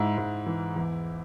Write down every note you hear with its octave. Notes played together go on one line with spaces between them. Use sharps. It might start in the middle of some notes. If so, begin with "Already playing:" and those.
Already playing: G#2 E4
G#2
E3
E2